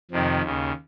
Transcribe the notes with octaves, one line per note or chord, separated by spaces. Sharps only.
F2 C3 D#3
D#2 C#3